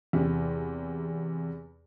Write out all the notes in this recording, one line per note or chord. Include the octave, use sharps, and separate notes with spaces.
E2 C3 G4